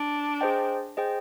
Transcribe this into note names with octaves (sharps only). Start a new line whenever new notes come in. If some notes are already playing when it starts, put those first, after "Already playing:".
Already playing: D4
G#4 C5 D#5 G5
G#4 C5 D#5 G5